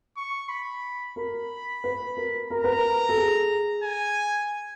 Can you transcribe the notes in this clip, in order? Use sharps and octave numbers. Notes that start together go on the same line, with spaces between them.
C#6
B5
A#4 B5
B4
A#4
A#4 A#5
B4
A#4
A4
G#4
G#5